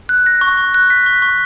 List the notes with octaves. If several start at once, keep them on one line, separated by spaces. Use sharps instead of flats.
F#6
A#6
C#6
C#6
F#6
B6
C#6
C#6